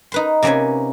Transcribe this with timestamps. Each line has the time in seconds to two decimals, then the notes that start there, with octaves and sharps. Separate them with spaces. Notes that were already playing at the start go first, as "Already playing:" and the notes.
0.12 D#4 B4 C6
0.43 C3 A#3 C#4 B4 G#5